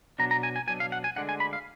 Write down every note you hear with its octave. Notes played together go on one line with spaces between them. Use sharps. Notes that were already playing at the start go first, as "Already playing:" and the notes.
B2 F#3 D4 A#5
A#5
G#5
G#5
B2 F#3 D4 G#5
F5
F#5
G#5
D2 D3 G#3 D4 F#5
G#5
B5
F5